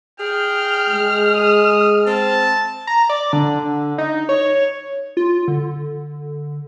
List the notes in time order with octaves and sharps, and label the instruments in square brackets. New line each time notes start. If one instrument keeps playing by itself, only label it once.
[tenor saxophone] G#4 [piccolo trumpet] G5 [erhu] F6
[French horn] G#3
[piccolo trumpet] D#6
[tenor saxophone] C4 [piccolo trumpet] A5
[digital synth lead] A#5
D5
D3
D#4
C#5
F4
D3